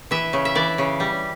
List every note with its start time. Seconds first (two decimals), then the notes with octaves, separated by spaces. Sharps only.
0.11 E3 E5
0.33 C#3
0.45 E5
0.55 E3 D5
0.78 C#3
1.00 G3